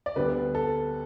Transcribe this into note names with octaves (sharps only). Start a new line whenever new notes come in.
D5
D2 D3 G3 B3 B4
A4